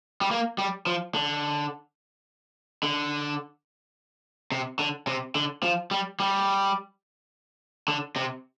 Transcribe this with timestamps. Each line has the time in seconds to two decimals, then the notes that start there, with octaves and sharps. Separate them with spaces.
0.21 G3
0.31 A#3
0.58 G3
0.87 F3
1.15 D3
2.83 D3
4.52 C3
4.79 D3
5.07 C3
5.35 D3
5.63 F3
5.91 G3
6.20 G3
7.88 D3
8.16 C3